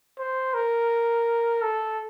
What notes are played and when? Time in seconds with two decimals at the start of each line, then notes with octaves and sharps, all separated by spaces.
0.18 C5
0.54 A#4
1.62 A4